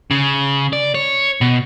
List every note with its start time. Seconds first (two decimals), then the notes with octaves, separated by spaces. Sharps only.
0.11 C#3
0.73 D5
0.95 C#5
1.41 B2